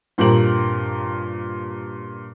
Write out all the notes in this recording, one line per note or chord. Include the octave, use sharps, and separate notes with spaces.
G2 A#2 C4 G4 A#4 F#7